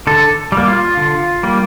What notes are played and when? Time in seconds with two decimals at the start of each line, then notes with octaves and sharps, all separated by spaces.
0.07 D3 A4
0.52 G3
0.57 A#3
0.68 F4
0.97 D3
1.43 G3 A#3